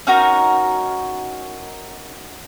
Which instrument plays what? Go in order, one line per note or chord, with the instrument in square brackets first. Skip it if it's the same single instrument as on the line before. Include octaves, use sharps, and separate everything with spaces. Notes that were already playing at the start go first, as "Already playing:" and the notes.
[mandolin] C#4 D#4 F#4 A#4